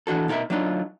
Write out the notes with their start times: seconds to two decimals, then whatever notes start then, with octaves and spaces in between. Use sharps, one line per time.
0.07 E3 D4 F#4 A4
0.28 B2 D#4 G#4 A#4 E5
0.50 F#3 D4 D#4 F4